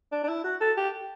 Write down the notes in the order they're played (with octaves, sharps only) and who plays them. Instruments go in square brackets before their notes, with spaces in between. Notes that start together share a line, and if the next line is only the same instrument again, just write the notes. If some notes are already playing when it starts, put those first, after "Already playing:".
[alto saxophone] D4
D4
E4
F#4
A4
G4